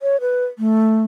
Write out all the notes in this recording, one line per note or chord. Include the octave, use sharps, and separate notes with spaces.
C#5
B4
A3